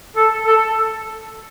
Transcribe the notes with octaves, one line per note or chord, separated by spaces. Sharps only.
A4
A4